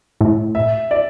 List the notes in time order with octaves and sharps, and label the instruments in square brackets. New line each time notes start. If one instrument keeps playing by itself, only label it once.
[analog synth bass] A2
[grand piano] E5
D5